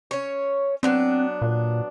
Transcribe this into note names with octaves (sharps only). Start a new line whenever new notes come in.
C#4 C#5
F#3 B3 C4 D4
A#2